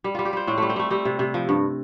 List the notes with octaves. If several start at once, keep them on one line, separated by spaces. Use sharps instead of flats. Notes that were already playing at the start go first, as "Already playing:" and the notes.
G3
G3 F4
G4
G3 C5
A2 C4
G3 A3
C4
G3 A3
G3 C4
C3
C3
F3
G2